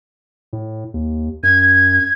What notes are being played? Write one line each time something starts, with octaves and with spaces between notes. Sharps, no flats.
A2
D#2
F#2 G#6